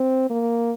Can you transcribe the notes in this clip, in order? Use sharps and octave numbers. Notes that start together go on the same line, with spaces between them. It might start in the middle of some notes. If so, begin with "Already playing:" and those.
Already playing: C4
A#3